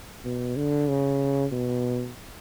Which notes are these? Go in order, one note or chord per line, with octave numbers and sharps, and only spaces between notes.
B2
D3
C#3
B2